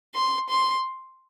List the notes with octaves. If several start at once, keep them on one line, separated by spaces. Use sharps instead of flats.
C6
C6